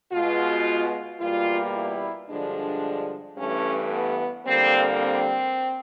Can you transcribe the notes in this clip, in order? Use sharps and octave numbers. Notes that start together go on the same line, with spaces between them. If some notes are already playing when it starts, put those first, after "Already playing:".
B2 G#3 F4
E2 B2 G3 A#3 F4
E4
G2 D3 F3 G#3 D4
G2 E3 A3 C#4
B3
F2 D3 G3 A#3 C4
C4